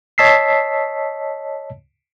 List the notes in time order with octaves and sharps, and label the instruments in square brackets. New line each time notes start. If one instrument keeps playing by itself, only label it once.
[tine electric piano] C#5 D#5 A5 E6 B6 C7